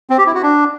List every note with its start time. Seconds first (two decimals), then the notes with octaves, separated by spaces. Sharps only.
0.10 C4
0.18 G4
0.26 E4
0.35 F#4
0.43 D4